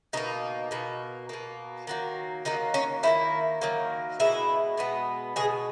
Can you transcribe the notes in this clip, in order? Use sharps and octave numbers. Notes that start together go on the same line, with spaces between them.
B2 A#3 D#4
B2 A#3
B2 A#3
D#3 F#3 A#3
D#3 F#3 A#3 D#4
C#4
D#3 F#3 A#3 E4
D#3 F#3 A#3
B2 G#3 B3 E4
B2 G#3 B3
B2 G#3 B3 G#4